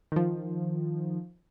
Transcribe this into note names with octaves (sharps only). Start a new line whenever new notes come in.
D#3 F3